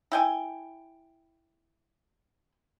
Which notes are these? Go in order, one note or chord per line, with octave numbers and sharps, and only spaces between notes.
E4 G5 G#5